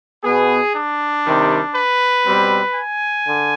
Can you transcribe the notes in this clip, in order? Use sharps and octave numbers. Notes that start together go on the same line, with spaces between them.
B2 B3 G#4
D4
C3 D#3 G3
B4
B2 G3 C4
G#5
D3